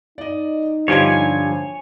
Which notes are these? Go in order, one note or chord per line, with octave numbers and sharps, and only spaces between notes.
D#4 D5 D#5
G2 D3 F3 G3 C#5 G#5 C6